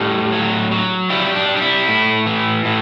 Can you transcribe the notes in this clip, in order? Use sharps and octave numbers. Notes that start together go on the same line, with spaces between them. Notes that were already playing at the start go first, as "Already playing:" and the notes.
Already playing: A2 G3
F#3
F#3
G3 E4
D4
G3
D4
E4
A2
E3
A2